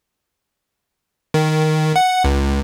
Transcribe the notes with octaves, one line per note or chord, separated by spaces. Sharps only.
D#3
F#5
C#2